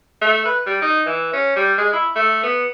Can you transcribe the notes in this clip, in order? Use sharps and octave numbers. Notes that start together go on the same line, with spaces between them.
A3
B4
G3
D#4
E3
C#4
G3
G#3
E4
A3
B3